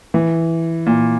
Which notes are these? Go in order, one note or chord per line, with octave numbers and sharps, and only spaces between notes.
E3
A#2